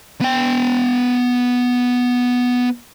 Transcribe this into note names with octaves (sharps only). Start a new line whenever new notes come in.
B3 G5